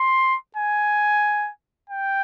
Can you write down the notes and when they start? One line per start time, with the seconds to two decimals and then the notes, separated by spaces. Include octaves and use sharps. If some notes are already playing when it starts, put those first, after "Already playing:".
Already playing: C6
0.56 G#5
1.90 G5